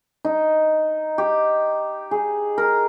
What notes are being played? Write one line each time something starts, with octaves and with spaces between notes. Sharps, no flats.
D#4
G4
G#4
A#4